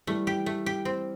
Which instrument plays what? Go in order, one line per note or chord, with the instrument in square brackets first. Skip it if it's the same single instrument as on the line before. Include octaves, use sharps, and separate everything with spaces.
[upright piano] E3 G3 [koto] A3
[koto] G4
A3
G4
C4